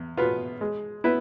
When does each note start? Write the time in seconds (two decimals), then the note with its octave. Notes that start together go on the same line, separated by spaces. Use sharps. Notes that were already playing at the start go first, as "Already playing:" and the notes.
Already playing: E2
0.17 B2 B3 F4 B4
0.61 G#3
1.04 B3 E4 B4